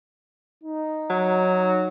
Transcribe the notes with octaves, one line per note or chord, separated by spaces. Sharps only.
D#4
F#3